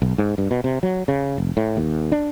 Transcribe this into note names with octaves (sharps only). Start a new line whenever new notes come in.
B1
G#2
G2
B2
C3
F#3
C#3
F1
A2
D#2
D4